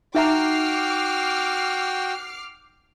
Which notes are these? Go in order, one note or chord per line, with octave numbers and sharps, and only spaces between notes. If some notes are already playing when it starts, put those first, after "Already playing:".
D#4 F#4 E5 G5 A#5 D6 F6 C7